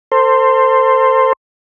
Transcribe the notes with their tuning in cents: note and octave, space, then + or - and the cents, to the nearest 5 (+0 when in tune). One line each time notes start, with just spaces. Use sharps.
A4 +40 C5 +0